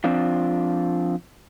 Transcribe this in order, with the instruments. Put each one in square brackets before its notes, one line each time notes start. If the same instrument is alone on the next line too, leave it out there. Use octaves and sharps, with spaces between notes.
[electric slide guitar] F3 C4 D4 F4